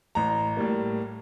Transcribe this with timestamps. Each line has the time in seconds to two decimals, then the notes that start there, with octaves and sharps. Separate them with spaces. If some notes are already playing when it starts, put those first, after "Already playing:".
0.15 A1 A#5
0.57 A2 G3 A#3